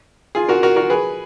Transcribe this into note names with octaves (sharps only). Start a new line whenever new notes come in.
F4 G#4
F#4 A#4
F#4 A#4
F#4 A#4
G#4 B4